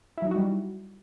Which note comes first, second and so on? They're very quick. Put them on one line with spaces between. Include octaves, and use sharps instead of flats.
E4 F#3 D#4 F#4 G3